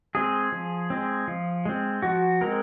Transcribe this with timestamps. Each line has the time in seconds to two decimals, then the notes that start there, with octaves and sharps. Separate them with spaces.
0.15 G#3 C4 G#4
0.52 F3
0.90 G#3 C4
1.28 F3
1.65 G#3 C4
2.02 F3 F#4
2.41 G#3 C4 A#4